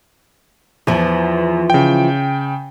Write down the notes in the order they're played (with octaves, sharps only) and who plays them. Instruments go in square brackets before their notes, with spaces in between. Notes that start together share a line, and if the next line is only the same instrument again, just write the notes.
[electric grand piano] E2 [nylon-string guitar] E3 F3
[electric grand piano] C#3 G5